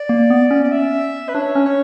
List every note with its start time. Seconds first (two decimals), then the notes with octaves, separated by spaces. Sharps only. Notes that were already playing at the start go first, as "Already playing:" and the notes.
Already playing: D5
0.09 A#3
0.30 B3
0.51 C#4
0.64 D5
0.72 E5
1.29 B4
1.34 D4 C#5
1.55 C#4
1.66 C#5